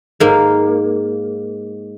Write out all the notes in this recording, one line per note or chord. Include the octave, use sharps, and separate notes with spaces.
G#2 A#3